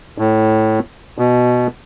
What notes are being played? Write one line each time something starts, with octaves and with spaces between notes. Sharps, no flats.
A2
B2